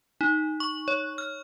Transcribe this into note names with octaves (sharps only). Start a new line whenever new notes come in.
D#4
C#6
C#5
F6